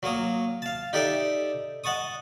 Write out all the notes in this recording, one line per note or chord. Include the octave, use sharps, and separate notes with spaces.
F#3 A#3 C#5 D#6
F5 A5
D#4 G4 A4 D5 E5 G5
D#5 F#5 A5 C#6 D#6